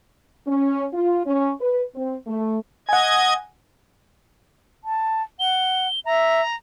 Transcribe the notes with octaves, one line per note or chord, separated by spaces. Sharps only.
C#4
F4
C#4
B4
C4
A3
D#5 F#5 G#5 G#6
A5
F#5 G7
E5 A#5